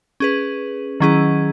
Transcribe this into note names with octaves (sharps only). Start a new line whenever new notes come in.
C#4 G#4 B4
D#3 F#3 C#4 E4 G#4